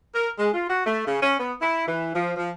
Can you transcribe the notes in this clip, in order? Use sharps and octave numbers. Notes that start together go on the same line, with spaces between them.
A#4
G#3
F4
F#4
A3
C#3
C#4
B3
E4
E3
F3
F3